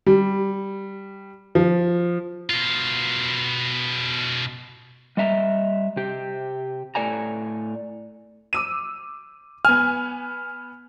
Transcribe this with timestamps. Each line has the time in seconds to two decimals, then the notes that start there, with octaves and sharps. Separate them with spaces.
0.06 G3
1.55 F3
2.50 B2 F4
5.17 G3 D#5 E5 A#5
5.96 C3 G4
6.95 A2 A4 D5 G#5 A#5
8.53 D6 E6 D#7
9.65 B3 G#5 F6